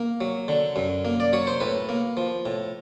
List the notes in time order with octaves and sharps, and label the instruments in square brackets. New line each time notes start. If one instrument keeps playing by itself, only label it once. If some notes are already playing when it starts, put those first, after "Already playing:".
Already playing: [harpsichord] A#3
F#3
D3
F#2
A#3
D5
F#3 C#5
C5
A2 B4
A#3
F3
A2